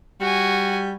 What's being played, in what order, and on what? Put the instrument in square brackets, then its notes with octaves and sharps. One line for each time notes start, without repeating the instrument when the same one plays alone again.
[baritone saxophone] G3 [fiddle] F#4 G#5